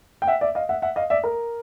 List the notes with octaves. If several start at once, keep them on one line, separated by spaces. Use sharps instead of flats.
G5
E5 F#5
D5 E5
D#5 F5
E5 F#5
E5 F#5
D#5 F5
D5 E5
A#4